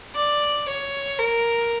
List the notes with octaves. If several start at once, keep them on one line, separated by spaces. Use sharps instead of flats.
D5
C#5
A#4